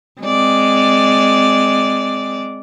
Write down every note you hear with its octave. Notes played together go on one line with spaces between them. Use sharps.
G#3 C4 D5